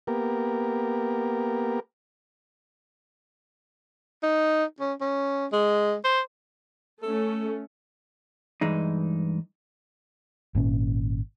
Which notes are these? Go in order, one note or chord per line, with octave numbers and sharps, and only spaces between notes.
A#3 B3 G4 A#4
D#4
C#4
C#4
G#3
C5
A3 C#4 A4
G2 E3 G#3 D#4
G#1 A#2 C#4